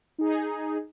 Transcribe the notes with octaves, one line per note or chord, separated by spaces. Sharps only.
D#4 G#4